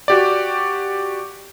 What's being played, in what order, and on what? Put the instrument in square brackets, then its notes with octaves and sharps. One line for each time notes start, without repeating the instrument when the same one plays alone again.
[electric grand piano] F#4 G4 D5